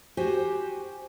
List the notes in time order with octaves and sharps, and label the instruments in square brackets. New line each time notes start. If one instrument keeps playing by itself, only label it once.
[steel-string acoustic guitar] F#4 G4 C5 G5 G#5